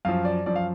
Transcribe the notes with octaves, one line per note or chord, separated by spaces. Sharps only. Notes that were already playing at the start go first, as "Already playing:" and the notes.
F#2 F3 F5
D5
F#2 F3 D5
F5